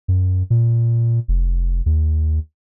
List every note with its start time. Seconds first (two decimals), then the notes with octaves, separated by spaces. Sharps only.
0.08 F#2
0.50 A#2
1.28 F1
1.86 D#2